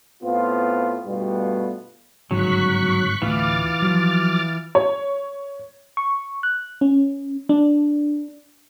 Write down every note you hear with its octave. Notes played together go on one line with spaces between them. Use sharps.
A2 B3 C4 F4
G2 B2 G3 A3 B3 F4
G1 G#2 C#3 F#3 C#6 F#6 B6
D2 A2 E3 F4 D6 F6 A6
F3 F#3
C#5
C#6
F#6
C#4
D4